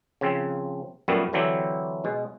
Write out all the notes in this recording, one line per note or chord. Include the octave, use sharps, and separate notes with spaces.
C#3 F3 C4
F#2 A#2 G3 A3 B3
D3 E3 F#3 C4 E4 G4
B2 G#3